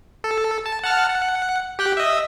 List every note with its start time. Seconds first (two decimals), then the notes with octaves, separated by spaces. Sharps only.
0.24 A4
0.66 A5
0.84 F#5 A5 F6
1.08 F#5
1.79 G4 G5 F#6
1.97 D#5 E5